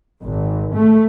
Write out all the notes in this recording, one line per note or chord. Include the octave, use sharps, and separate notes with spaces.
G#1
A3